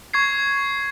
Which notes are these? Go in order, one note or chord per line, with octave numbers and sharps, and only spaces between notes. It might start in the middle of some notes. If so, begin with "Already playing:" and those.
C#6 G#6 C7